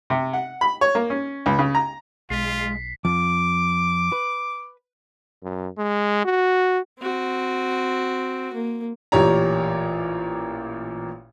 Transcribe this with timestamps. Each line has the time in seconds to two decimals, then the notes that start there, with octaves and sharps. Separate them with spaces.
0.10 C3
0.33 F#5
0.61 B5
0.81 C#5
0.95 A#3
1.10 C#4
1.46 C#2
1.59 C#3
1.75 A#5
2.30 B1 G#3 F4 B6 C7
3.05 F2 F3 D6
4.12 B4
5.43 F#2
5.78 G#3
6.25 F#4
7.00 C4 F#4
8.53 A#3
9.12 A1 A#2 G4 C#5 A#5